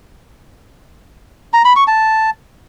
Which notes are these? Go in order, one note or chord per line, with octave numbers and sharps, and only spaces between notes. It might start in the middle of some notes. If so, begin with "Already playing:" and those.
A#5
B5
C#6
A5